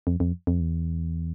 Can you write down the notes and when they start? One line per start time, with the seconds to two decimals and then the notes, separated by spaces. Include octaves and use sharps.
0.07 F2
0.20 F2
0.47 F2
0.60 E2